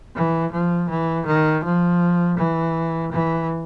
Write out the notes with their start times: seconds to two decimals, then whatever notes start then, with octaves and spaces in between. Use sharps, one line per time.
0.15 E3
0.52 F3
0.89 E3
1.26 D#3
1.64 F3
2.38 E3
3.12 E3